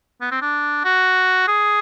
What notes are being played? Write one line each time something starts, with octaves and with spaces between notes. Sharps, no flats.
B3
C4
D4
F#4
G#4